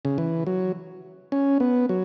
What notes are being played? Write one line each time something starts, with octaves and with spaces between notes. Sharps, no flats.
C#3
E3
F#3
C#4
B3
F#3